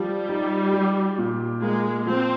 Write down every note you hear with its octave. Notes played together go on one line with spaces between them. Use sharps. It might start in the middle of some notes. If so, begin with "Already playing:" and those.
Already playing: F3 G3
D#4
G4
A#2
G#3 A#3
F3 C4